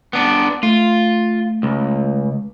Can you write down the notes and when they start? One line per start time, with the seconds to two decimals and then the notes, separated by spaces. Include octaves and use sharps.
0.13 B3 D4
0.63 A3 F4
1.63 C#2